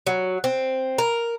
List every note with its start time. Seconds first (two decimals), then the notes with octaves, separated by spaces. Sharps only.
0.07 F#3
0.44 C4
0.98 A#4